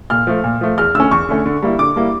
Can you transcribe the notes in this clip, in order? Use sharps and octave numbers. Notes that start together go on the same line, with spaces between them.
A#2 F6
F3 A3
A#2
F3 A3
E2 F6
D3 A3 C#4 E6
E2 C#6
D3 A3 C#4
D3
G3 A#3 E4
D3 D6
G3 A#3 E4